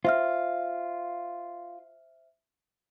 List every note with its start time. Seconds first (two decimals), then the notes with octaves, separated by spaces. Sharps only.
0.05 F4 C5 E5 F6